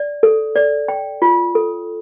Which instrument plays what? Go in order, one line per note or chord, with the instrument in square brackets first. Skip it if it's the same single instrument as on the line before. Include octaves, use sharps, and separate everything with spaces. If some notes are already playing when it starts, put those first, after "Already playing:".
Already playing: [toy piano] D5
A4
D5
G5
F4
A4